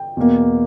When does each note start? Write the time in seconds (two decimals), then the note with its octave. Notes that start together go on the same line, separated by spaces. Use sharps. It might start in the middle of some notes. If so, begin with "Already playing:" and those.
Already playing: G5
0.17 E2 B2 A#3